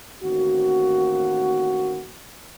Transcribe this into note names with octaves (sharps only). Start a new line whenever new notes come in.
A1 D#2 A#3 C4 F#4